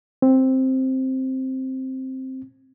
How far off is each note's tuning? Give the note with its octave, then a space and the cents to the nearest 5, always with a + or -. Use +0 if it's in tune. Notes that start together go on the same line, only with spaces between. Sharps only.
C4 +5